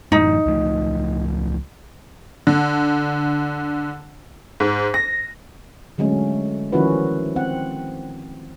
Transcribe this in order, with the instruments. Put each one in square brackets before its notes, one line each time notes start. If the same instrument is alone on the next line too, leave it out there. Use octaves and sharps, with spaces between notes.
[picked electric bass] F#2 A2 E3 [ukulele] D#4
[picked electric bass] C#2 F3 A3
[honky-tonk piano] D3
G#2
A#6
[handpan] D3 F#3 G#3 A3 C#4
D#3 F3 C#4 E4 F#4 B4
C4 F#5